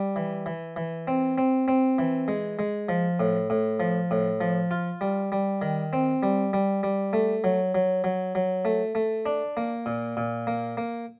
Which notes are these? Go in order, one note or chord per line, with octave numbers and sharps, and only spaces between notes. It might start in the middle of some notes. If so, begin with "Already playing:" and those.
Already playing: G3
E3
E3
E3
C4
C4
C4
E3
G#3
G#3
F3
A2
A2
F3
A2
F3
F4
G3
G3
D#3
C4
G3
G3
G3
A3
F#3
F#3
F#3
F#3
A3
A3
D4
A#3
A#2
A#2
A#3
A#3